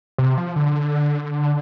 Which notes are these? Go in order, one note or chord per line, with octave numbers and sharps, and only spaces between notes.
C3
F3
D3